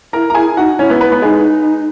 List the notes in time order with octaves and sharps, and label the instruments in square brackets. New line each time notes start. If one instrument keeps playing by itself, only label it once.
[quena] E4 [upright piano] A#4 A#5
[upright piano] A#5
[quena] E4 [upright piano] G#4 G#5
[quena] D#4 [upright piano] F#4 F#5
[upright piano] C#4 C#5 [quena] E4
[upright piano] B3 B4
B3 B4
B3 B4
[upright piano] G#3 G#4 [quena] D#4